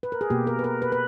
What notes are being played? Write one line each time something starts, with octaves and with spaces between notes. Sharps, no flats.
B4
A#4
G#4
B2 A#3 G4
A#4
B4
A#4
B4
B4